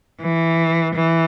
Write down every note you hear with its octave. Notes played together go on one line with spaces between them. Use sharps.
E3
E3